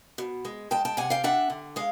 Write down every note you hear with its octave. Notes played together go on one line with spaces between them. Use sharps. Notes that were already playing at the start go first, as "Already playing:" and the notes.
B2
G#3
G#3 G5 A5
G5 A5
C3 F#5 G#5
F5 G5
D4 E5 F#5
D3
G#3 F5